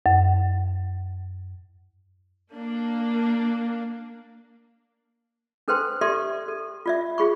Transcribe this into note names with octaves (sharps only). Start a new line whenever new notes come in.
F#2
A#3 D4
D4 A4 B4 C5 G5 C6
G4 A4 D5 E5 C6
A4
F4 D5 E5
F4 G#4 B5 C#6